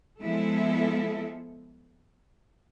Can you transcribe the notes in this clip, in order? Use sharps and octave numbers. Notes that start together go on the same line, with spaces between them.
F3 G#3 B3 E4 A4